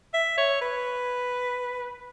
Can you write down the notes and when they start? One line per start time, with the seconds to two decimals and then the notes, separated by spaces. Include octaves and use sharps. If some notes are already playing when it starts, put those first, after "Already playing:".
0.14 E5
0.38 C#5
0.61 B4